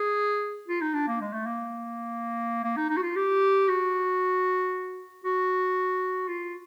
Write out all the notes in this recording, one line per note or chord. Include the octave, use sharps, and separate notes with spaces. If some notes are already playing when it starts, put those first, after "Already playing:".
Already playing: G#4
F4
D#4
D4
A#3
G#3
A3
A#3
A#3
D#4
D#4
F#4
F4
G4
F#4
F#4
F4